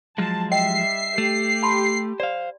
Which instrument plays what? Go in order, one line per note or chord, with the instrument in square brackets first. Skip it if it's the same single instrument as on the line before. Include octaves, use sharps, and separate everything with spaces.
[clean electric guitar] F3 F#3 G#3 [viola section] A5
[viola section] G3 E5 [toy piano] D#5 G5 [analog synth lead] C7
[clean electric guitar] A3 [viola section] G4
[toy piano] A5 B5 C6
[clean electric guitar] C5 F5 [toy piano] D5